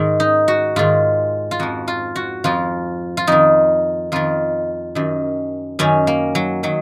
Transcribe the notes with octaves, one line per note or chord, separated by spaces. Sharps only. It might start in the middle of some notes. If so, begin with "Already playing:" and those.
Already playing: G#2 D#3
D#4
F#4
G#2 D#3 F4
F4
F2 F3 F#4
F4
F#4
F2 F3 F4
F4
F2 D#3 D#4
F2 D#3 F4
F#2 D#3
F#2 D#3 C#4
A#3
F#3
D#3 F#3